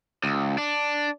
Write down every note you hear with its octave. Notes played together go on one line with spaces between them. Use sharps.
C#2
D4